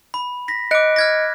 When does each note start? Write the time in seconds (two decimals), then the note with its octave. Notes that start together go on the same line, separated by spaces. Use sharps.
0.14 B5
0.48 A#6 B6
0.71 D#5 D6 F#6 C#7 D7
0.96 F6 G#6 A#6